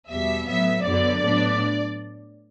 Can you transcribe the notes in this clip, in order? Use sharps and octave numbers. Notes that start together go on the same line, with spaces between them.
E2 B2 G3 E5
A2 F#3 B3 E5
F#2 D3 F#3 B3 D5
A2 F#3 B3 D4